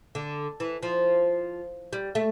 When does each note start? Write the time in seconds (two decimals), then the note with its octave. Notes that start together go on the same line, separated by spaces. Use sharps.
0.15 D3
0.60 E3
0.83 F3
1.93 G3
2.15 A3